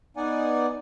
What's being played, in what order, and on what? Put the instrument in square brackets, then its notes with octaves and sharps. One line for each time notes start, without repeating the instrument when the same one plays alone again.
[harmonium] B3 D#4 D5 F#5 G#5